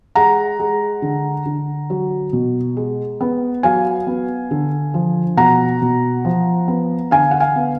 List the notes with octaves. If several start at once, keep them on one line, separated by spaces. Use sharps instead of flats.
G#3 F#5 A#5
G#3
D3
D3
F#3
B2
G#3
B3
F#3 F5 G#5
B3
D3
F3
B2 F#5 A#5
B2
F3
B3
D3 F5 G#5
F#5
F5 G#5
B3